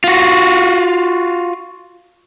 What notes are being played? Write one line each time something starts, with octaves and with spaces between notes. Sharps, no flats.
F4 F#4